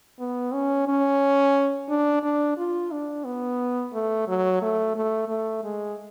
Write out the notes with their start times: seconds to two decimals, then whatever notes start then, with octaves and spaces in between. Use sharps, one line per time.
0.20 B3
0.53 C#4
0.88 C#4
1.89 D4
2.23 D4
2.58 F4
2.92 D4
3.25 B3
3.93 A3
4.28 F#3
4.62 A3
4.96 A3
5.29 A3
5.64 G#3